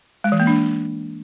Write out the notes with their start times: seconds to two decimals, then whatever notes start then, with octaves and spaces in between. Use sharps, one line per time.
0.24 G#3
0.32 E3
0.40 A#3
0.47 D4